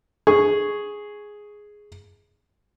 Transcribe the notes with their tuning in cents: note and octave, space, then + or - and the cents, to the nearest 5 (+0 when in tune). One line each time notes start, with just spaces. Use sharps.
G#4 +0 C#6 +0